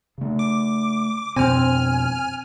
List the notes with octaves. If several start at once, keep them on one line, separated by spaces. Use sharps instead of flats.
C#3 A3
D6
F2 B2 C4 G#5 F6